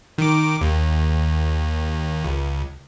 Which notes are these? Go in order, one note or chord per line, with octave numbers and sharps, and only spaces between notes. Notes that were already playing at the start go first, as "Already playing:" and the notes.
D#3 D6
D#2
C#2